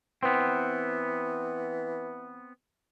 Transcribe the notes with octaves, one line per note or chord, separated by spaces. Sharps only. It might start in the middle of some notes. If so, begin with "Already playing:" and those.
E3 B3 C4